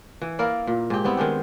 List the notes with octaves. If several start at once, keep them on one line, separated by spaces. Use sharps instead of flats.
E3
A#3 E4 A#4 D5
A#2
G#2 G4
G3 B3 C4 E4
D#3 G#3 D4 G4